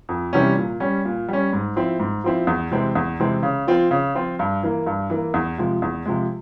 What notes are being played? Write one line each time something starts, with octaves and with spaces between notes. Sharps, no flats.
F2
C3 E3 G3 C#4
A#2
G3 C#4
A#2
G3 C#4
G#2
F3 C4 E4
G#2
F3 C4 E4
E2
C3 E3 G#3 C4
E2
C3 E3 G#3 C4
C#3
F3 C4 F4
C#3
F3 C4 F4
G2
E3 A#3
G2
E3 A#3
E2
C3 F3 G#3
E2
C3 F3 G#3